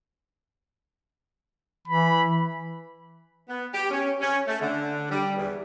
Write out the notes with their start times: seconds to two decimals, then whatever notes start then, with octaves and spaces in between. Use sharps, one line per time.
1.88 E3 B5
3.49 B3
3.73 G4
3.91 C#4
4.21 C#4
4.47 A3
4.60 D3
5.11 G3
5.37 E2